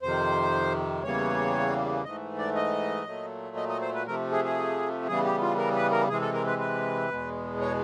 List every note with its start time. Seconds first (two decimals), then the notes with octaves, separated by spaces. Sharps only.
0.02 F2 C3 D#3 C5
1.03 E2 C#3 E3 G3 A#3 C#5
2.04 G#2 E3 A3 D#5
2.38 D5
2.55 D#5
3.05 A#2 F#3 A3
3.57 D#5
3.69 D#5
3.81 C5
3.95 B4
4.06 C3 F3 A3 A#4
4.32 G#4
4.45 G#4
5.08 C#3 E3 G3 B3 G#4
5.24 G4
5.41 F4
5.58 A#4
5.75 B4
5.91 A#4
6.09 C3 E3 G#3 C4 G#4
6.21 A4
6.34 A#4
6.47 B4
6.59 B4
7.10 E2 B2 G#3 B3
7.61 C#5